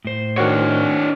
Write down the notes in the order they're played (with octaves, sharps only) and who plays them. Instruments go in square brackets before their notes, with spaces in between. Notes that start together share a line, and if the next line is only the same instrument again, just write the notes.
[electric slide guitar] A2 C5
[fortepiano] D#3 F#4 [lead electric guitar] D4 C#5